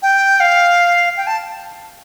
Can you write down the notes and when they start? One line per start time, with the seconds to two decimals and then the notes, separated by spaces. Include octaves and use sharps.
0.02 G5
0.40 F5
1.17 G5
1.27 A5